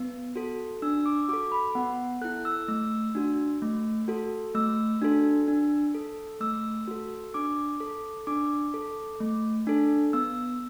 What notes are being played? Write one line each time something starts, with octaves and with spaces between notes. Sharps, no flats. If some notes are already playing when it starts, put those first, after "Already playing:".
Already playing: B3
F#4 A4
D4 E6
D6
F#4 A4 D6
B5
B3 F#5
E4 A4 F#6
E6
A3 E6
D4 F#4
A3
F#4 A4
A3 E6
D4 F#4 A4
D4
A4
A3 E6
F#4 A4
D4 D6
A4
D4 D6
A4
A3
D4 A4
B3 E6